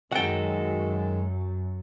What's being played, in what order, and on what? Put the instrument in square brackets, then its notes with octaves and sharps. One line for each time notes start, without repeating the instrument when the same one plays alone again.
[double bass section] F#2 [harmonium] D#3 G#3 [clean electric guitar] F#3 A4 [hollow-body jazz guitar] F#5 G5